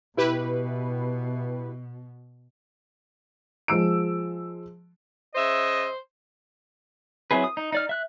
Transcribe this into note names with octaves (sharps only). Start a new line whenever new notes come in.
B2 E4 G4 B4
F3 G#3 E6 D7
C#3 C5 D#5 E5
F#3 C4 E4 G#4 B4
D#6
D#4
D#4 D5 F6
E5 F#6